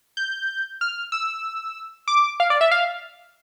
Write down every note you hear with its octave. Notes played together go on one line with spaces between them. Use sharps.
G6
F6
E6
D6
F5
D5
E5
F5